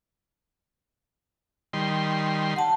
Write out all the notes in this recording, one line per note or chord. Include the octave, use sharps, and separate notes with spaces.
D#3 G3 C6
F#5 A5